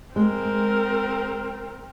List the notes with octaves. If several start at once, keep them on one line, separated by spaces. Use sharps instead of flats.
G#3 C4 A#4